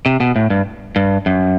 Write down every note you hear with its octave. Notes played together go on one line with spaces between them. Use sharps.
C3
B2
A2
G2
G2
F#2